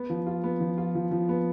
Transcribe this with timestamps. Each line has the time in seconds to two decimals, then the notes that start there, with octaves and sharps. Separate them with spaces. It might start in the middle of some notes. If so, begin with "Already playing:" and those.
Already playing: B3
0.10 F3
0.27 F4
0.44 B3
0.60 F3
0.78 F4
0.95 F3
1.11 F3
1.29 B3